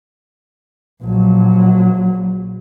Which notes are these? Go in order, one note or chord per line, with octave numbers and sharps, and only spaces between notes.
A#1 F#3